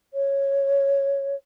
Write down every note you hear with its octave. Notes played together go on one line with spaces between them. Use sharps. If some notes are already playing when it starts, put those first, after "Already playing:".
C#5